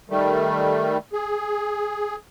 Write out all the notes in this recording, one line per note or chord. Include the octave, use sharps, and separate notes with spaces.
D#3 G3 A3
G#4